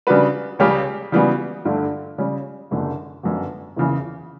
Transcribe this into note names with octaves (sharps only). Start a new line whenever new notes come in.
C#3 G3 D4 F#4 B4
C#2 C#3 G3 C#4 G4
C#3 E3 G3 B3 F#4
G2 D3 A3
C#3 G3 C#4
F#1 F#2 D3
G1 F#2 D3
F#1 E2 C#3 E3